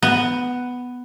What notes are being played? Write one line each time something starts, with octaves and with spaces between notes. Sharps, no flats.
B3